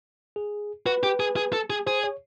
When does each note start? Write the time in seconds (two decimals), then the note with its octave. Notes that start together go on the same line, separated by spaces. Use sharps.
0.36 G#4
0.86 F#4 B4
1.03 G4
1.20 G#4
1.37 G#4
1.53 A4
1.70 G#4
1.86 G#4 C5
2.04 C#5